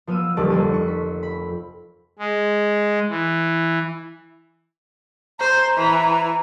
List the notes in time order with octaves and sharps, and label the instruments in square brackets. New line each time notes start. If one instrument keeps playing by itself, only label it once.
[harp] F3 B3 F5 E6 D#7
D#1 D2 D#3 G3 A5 D6
F1 F2 D#7
C#6
B6
B5
[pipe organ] G#3
E3
[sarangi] C5 [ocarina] A#5
[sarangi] E3